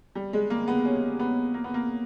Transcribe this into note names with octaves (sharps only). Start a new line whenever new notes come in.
G3
G#3
A#3
B3
C#4
B3
A#3
B3
A#3